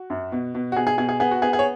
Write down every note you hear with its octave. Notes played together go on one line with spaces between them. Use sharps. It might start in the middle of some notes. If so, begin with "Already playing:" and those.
Already playing: F#4
F#2
B2
B2
F#4
B2 G#4
G#4
B2 G#4
G#4
B3 G#4
F#4
B3 G#4
G#4
C#5